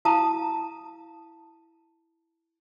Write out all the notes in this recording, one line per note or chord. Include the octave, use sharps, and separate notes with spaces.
E4 F5 A5 A#5 D#6